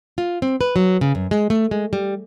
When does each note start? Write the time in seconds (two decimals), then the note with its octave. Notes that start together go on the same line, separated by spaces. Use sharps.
0.18 F4
0.42 C4
0.61 B4
0.76 F#3
1.01 C#3
1.15 F#2
1.31 G#3
1.50 A3
1.71 G#3
1.93 G3